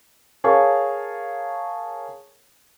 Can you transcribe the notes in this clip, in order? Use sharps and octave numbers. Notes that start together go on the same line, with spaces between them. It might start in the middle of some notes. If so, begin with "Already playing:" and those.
G#4 A#4 C#5 F5 A5 C#6